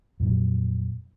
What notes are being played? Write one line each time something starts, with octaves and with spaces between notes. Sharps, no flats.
F2 A#2 F#3